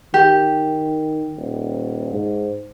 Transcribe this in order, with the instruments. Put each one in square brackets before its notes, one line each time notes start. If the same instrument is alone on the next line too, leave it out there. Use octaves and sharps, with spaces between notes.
[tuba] D#3 [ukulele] G4
[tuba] D#1
G#2